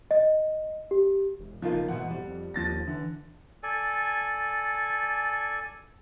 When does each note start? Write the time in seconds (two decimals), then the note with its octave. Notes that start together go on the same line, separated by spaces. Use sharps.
0.11 D#5
0.91 G4
1.40 E1
1.62 C#3 F3 A#3 D#4 F4
1.88 G#2 B2 E3 F#5
2.11 F2 G3
2.54 D#2 F3 A6 A#6
2.87 D3 E3
3.63 A4 D5 G#5